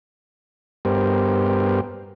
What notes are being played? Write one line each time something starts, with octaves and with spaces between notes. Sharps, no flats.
G2 G3 B3 G4 A#4 C5